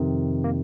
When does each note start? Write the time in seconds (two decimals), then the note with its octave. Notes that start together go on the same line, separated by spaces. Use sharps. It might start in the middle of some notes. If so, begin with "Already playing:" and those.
Already playing: F2 C3 D#3
0.44 A#3